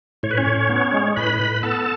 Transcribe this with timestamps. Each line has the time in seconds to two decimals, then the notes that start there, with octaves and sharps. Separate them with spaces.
0.23 A2 C#5
0.31 B4
0.37 C#4 C#5
0.46 A2
0.69 B3
0.94 G#3
1.16 A2 B4 B5
1.40 A2
1.63 B3 A4 A5